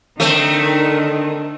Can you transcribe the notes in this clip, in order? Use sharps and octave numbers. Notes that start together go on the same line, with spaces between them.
D3 D#3 A3 C4